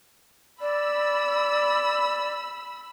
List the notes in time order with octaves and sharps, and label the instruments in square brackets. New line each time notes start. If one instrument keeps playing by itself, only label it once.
[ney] D5 [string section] B5 E6